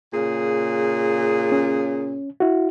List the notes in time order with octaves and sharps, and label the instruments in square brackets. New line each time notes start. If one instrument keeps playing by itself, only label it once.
[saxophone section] A#2 C#3 G#4
[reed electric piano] C#4
E4 F#4